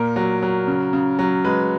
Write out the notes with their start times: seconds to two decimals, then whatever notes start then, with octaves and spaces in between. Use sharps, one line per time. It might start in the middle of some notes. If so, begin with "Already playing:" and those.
Already playing: A#2 A#4
0.16 F#3
0.42 F#3
0.67 C#3
0.93 C#3
1.19 F#3
1.45 G#3 B4